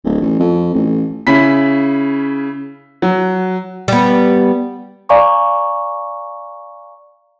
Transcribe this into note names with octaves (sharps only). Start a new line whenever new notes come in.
D1
A1
F2
A1
C#3 C#4 E4 B5 B6
F#3
G3 B3
D5 F5 G#5 A#5 C#6 D6